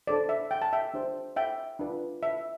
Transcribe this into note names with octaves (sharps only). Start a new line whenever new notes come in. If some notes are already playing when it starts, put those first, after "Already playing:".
D4 A4 C5 D5
E5
G5
A5
E5 G5
D4 G4 C5
E5 G5
D4 F4 B4
E5